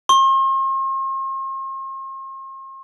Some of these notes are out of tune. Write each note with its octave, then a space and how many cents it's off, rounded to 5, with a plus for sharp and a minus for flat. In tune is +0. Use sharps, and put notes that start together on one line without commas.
C6 +45